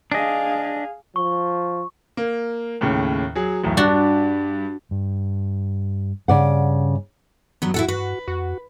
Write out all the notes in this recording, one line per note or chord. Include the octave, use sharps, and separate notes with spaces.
D4 G#4 D#5 F5
F3 C#6
A#3
D#2 A2 C#3
F#3 G#4
B1 E2 A2
G2 D4 F#4
G2
G2 C#3 D5 F#5
G2 F#3 B3
A2 E4 F#4 A4 F#5
G2 F#4 B4
F2 F#4